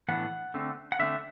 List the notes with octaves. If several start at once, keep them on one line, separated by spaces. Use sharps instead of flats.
A2 E3 B3 D4 F#5
D3 A3 C4
F#5
D3 A3 C4 E5